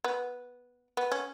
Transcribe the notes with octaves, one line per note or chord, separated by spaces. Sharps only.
B3
B3
C#4